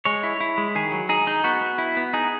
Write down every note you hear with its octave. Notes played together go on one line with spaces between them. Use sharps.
G#3 C#5
E4
E4
G#3
D#3 G#4
F#3
D#4 G#4
D#4
B3 F#4
B3
E4
B3
D#4 G#4